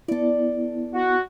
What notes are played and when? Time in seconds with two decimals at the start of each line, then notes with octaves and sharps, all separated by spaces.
0.08 B3 E4 A4 D5
0.94 F#4